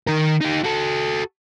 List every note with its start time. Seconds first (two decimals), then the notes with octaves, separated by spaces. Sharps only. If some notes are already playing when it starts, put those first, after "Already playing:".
0.07 D#3 A#4
0.41 D#4 G4
0.64 F#4 A4